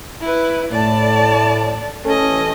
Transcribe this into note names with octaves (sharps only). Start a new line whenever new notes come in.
E4 B4
A2 D5 A5
A1 C#4 A4 D#5